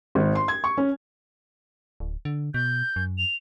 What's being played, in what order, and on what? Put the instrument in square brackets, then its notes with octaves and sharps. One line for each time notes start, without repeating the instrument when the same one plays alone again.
[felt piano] G#1
C6
G#6
C#6
C#4
[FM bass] D1
D3
[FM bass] B2 [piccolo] G6
[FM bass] F#2
[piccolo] F7